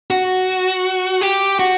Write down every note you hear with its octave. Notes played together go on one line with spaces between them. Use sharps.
F#4
G4
F#4